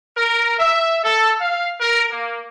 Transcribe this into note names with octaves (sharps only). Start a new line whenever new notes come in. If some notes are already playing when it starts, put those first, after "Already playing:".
A#4
E5
A4
F5
A#4
A#3